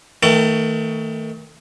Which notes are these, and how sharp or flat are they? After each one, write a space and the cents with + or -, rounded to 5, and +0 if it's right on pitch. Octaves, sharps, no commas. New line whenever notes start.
D#3 +40 A3 +25 G5 -40